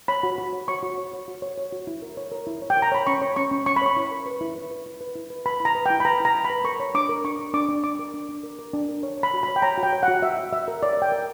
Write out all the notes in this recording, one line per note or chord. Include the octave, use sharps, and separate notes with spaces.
C#5 B5
F#4
F#4
C#5
C#5 C#6
F#4
C#5
C#5
F#4
C#5
C#5
F#4
E4
A#4
C#5
A#4
E4
C#5
G5
A#4
A#5
C#5 B5
C#4 C#6
C#5
C#4 C#6
C#4
C#4 C#6
B5
C#5 C#6
E4
A#4
B4
E4
B4
B4
E4
B4
E4
B4
B4 B5
E4 A#5
B4
E4 G5
B5
B4 A#5
E4 A#5
E4
B5
B4
A#4 C#6
C#5
D4 D6
A#4
D4 C#6
A#4
D4 D6
D4
D4 D6
A#4
D4
D4
A#4
A#4
D4
A#4
C#5
C#5
B5
F#4
B5
C#5
G5
C#5 A#5
F#4
G5
C#5
F#5
F#4
F#4 E5
F#4
F#4 E5
A#4
C#5 D5
A#4 G5
A#4